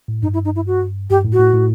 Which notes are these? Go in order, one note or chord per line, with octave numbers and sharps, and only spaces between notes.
A2
G2 D#4
E4
D#4
E4
F#4
G2 G4
A2
F#4
A2
A2